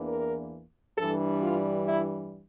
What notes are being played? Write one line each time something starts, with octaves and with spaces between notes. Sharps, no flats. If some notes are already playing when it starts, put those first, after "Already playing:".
Already playing: E2 E3 A#3 D4
A#4
G2 E3 G3 D4 A4
F4
E4